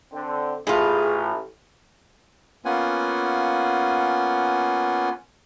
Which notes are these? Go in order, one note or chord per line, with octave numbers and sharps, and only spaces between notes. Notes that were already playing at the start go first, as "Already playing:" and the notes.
D3 C4
A1 A2 F4 G#4
A#3 B3 C#4 F4 F#5 G#5